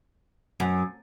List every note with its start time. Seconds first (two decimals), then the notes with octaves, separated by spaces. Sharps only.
0.60 F#2